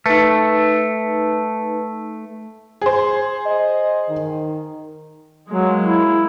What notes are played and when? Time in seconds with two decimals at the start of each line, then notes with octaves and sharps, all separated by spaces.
0.06 A3 D#4 B4
2.82 G#4 C5
3.46 D#5
4.09 D#3
5.49 F#3 G#3 A#3
5.82 E4